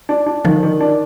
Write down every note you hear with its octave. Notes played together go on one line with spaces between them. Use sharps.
D4
D4
D3 D#3 F3
D#3
D4